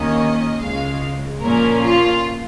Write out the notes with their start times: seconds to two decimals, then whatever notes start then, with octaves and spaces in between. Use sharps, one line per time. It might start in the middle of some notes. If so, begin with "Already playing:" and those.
Already playing: D#2 D#3 A#3 C#4 D#5
0.59 C#2 C#3 G#3 F5
1.41 A#2 F3 A#3 C#4 A#4
1.82 F4